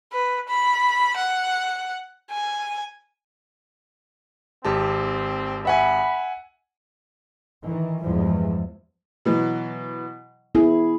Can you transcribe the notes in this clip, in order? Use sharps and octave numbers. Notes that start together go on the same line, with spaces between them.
B4
B5
F#5
G#5
G#1 C4 G4 A5
E5 F#5 G#5 B5
D#3 E3
E2 G2 E3 F3 G#3
B2 E3 F#3
B3 E4 G#4